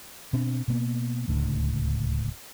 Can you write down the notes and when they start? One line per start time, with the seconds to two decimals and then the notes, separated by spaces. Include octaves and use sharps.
0.33 B2 C4 D4
0.68 B2 A#3 B3
1.28 D1 C#2 A2 D3